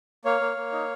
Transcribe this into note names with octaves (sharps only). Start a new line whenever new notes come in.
A#3 C#5 F5
A#3
A#3
D#4